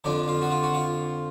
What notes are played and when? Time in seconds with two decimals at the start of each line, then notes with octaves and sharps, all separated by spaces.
0.04 F2 D3 F3 D4
0.28 F4
0.41 F#4
0.50 F4
0.63 F#4
0.74 F4